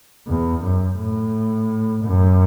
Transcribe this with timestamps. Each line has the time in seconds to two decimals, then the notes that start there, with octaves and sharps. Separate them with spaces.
0.28 E2
0.63 F#2
0.99 A2
2.04 F#2